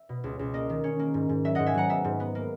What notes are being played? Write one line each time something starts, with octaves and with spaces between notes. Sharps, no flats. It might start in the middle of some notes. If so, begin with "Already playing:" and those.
Already playing: E5
B2
C#2
C#2
A#3 D#5
D#3
C#4
A#3
G#2
G#2
F#3 E5
G#2 D#5 F#5
E5 G#5
F#3 F#5 A#5
B3 E5
G#2
B3
A#3